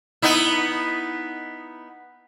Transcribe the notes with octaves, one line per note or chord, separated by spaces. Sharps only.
B3 D#4 E4